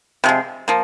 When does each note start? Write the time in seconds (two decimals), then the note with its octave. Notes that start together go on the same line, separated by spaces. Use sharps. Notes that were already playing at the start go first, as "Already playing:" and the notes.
0.24 C3 F3 G#3
0.68 F3 A#3